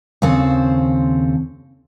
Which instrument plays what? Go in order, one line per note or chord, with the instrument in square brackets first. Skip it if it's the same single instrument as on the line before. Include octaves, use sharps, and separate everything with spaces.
[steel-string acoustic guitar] D#2 C#3 C4 A4 C5